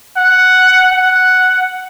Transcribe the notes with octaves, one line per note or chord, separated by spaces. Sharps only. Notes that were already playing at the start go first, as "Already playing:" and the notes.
F#5
F#5